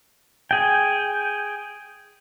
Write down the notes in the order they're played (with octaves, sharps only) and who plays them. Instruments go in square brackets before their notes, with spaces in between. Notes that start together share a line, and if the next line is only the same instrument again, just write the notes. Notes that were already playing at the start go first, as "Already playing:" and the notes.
[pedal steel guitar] G#4 G5